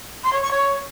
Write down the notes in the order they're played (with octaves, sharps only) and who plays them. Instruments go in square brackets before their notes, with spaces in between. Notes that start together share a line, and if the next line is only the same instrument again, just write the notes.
[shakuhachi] C6
C#5
C#6
C#5